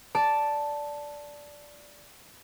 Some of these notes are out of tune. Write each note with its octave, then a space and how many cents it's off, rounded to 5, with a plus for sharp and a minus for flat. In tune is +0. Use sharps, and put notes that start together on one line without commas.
D5 -5 A5 +0